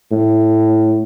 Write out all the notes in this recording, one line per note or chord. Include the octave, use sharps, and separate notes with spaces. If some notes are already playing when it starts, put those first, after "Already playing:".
A2